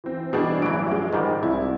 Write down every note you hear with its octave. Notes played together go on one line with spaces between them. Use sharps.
E3 C4
B2 E3 G3 D4 G#4
A1 G2 E3 F#3 D7
F3 G#3
G#2 D#3 G3
C2 E4